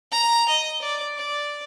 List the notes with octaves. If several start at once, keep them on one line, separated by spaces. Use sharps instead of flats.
A#5
D#5
D5
D5